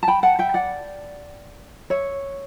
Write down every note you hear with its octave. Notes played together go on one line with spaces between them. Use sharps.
A5
G5 B5
F#5 A5
E5 G5
D5 F#5
C#5 E5